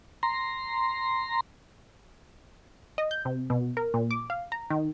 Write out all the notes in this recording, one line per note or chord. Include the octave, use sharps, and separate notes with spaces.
A#5 C6
D#5
G6
C3
B2
A#4
A#2
D6
F5
A#5
D#3